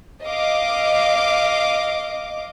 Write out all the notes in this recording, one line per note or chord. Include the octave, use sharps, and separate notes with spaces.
D#5 F5 D6